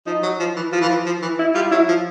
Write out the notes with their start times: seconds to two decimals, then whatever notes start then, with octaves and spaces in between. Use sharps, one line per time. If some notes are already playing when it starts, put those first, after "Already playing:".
0.06 F3 D#4
0.23 F#3
0.40 F3
0.56 E3
0.72 F3 F4
0.81 E3
0.89 F3
1.06 F3
1.22 E3
1.39 E4
1.55 G3 F4
1.71 F#3 E4
1.88 F3 F4